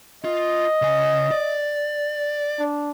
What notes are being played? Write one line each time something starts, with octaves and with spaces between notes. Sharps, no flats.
F4 D#5
C#3 G#5
D5
D4